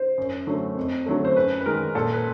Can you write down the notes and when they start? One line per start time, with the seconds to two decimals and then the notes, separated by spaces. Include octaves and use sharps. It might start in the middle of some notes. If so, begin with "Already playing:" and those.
Already playing: C5
0.18 F#2
0.47 D3 F#3 A3
0.77 F2
1.06 D3 F#3 A3
1.25 C5
1.36 F#2 B4
1.61 B4
1.65 D#3 G#3 A#4
1.95 A#2 A4
2.13 B4